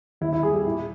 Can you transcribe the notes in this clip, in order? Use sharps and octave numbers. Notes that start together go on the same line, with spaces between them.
D#2 E4
E4
G3 G#4
G4
A#2 E4